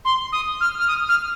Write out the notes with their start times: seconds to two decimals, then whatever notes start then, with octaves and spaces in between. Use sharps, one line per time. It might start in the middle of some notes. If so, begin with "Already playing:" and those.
0.05 C6
0.32 D#6
0.61 F6
0.78 F6
0.88 D#6
1.09 F6